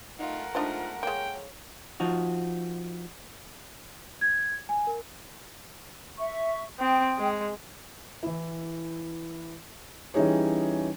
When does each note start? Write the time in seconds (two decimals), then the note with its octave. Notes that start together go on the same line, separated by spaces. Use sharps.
0.19 A3 D#4 F4 A#4 F#5
0.55 G#3 A3 D4 D#4 F4 C5
1.03 G#3 A#3 C#5 G5
2.00 F3 D#4 F#4
4.21 G#6
4.69 G#5
4.87 A#4
6.18 E5 C#6
6.79 C4 G5 D#6
7.18 G#3
8.23 E3 E4
10.14 E3 G3 C#4 D#4 G#4 C#5